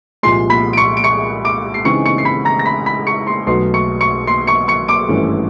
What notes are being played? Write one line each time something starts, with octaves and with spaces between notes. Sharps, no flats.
C2 A#2 F3 G#3 C6 C7
B5 B6
D7
C#6 C#7
D7
C#6 C#7
D6 D7
C7
C#3 E3 G#3 C4 D#4 C#6 C#7
C#6 C#7
C7
B5 B6
A#5 A#6
A#6
B5 B6
B5 B6
C#6 C#7
C6 C7
B1 B2 F#3 A3 C6 C7
C#6 C#7
C#6 C#7
C6 C7
C#6 C#7
C#6 C#7
D6 D7
G#1 G2 E3 A3 C#4